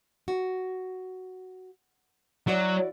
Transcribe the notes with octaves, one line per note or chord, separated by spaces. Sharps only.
F#4
F#3 E4 F#4 D5